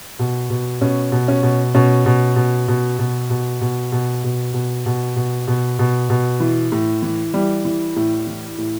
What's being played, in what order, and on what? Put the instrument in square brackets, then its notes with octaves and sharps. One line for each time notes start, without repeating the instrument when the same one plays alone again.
[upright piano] B2
B2
B2 C#4
B2
C#4
B2
B2 C#4
B2
B2
B2
B2
B2
B2
B2
B2
B2
B2
B2
B2
B2
B2
E3
A2
E3
E3 G3
E3
A2
E3
A2